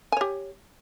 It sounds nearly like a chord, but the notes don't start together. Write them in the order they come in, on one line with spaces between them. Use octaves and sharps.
G#5 C#5 G4